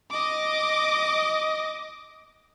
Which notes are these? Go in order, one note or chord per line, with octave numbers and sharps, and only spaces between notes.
D#5 D6